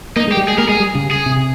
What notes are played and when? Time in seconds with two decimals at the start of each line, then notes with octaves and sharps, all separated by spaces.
0.16 A#3 D#4
0.28 G#3
0.32 G4
0.37 G3
0.48 G#3 G#4
0.58 A#3 A#4
0.69 G#3 G#4
0.80 G3
0.95 C#3
1.11 G#4
1.26 C3